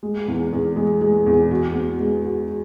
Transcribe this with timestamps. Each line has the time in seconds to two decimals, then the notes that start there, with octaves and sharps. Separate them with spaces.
0.03 G#3
0.28 E2
0.52 E2
0.76 G#3
1.01 G#3
1.26 E2
1.51 F#4
1.75 B3
1.99 G#3
2.25 F#4